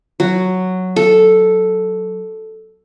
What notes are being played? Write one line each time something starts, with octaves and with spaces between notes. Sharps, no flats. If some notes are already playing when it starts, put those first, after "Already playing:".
F#3
A4